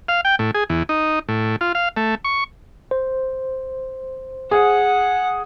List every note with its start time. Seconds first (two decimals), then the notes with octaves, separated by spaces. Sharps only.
0.08 F5
0.25 G5
0.39 A2
0.55 G#4
0.69 E2
0.89 D#4
1.28 A2
1.61 F4
1.75 F5
1.97 A3
2.25 C#6
2.91 C5
4.51 G#4 F#5